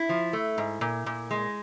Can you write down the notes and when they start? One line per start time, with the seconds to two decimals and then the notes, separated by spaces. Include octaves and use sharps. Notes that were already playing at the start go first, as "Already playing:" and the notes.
Already playing: E4
0.09 F3
0.33 A3
0.58 G#2
0.81 A#2
1.06 A#2
1.31 G#3